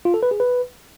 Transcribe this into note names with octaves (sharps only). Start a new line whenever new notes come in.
F4
A4
B4
G#4
B4